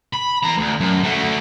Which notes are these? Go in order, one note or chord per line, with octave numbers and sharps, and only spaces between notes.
B5
E2 A#5
D2
F#2
A3 F#4